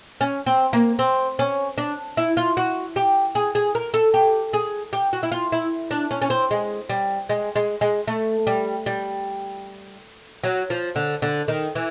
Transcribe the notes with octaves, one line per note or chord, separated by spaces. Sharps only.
C#4
C4
A#3
C4
C#4
D4
E4
F4
F#4
G4
G#4
G#4
A#4
A4
G4
G#4
G4
F#4
E4
F4
E4
D4
C#4
C#4
C4
G#3
G3
G#3
G#3
G#3
A3
G3
G3
F#3
F3
D3
D3
D#3
E3